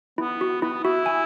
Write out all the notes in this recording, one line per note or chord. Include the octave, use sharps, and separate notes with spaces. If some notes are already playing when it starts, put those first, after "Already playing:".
B3 E4
F#4
B3 E4
E4 F#4
G#5